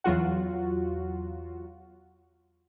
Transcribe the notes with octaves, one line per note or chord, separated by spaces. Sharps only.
E2 F#3 F4 F#4